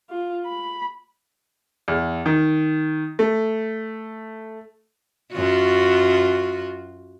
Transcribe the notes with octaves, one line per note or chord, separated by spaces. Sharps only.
F4
B5
E2
D#3
A3
F#2 F4 F#4